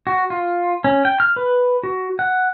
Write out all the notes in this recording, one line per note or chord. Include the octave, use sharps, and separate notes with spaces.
F#4
F4
C#4
G5
F6
B4
F#4
F#5